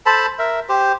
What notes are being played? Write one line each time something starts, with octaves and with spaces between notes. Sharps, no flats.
A4 C5 A5 B5
A#4 E5
G4 C5